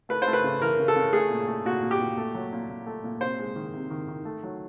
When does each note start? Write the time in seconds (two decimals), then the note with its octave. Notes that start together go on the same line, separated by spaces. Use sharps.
0.09 A3 B4
0.22 C5
0.27 A3
0.33 B4
0.44 C#3
0.62 E3 A#4
0.79 C#3
0.88 A4
0.96 C#3
1.13 A3 G#4
1.30 A#2
1.48 A3
1.65 A#2 F#4
1.82 A#2
1.91 G4
2.00 A#2
2.17 A3
2.34 F#3
2.53 A#2
2.70 A#2
2.86 A3
3.04 A#2
3.21 C3 C5
3.39 G#3
3.56 D#3
3.74 C3
3.90 D#3
4.08 D#3
4.25 A3
4.43 F#3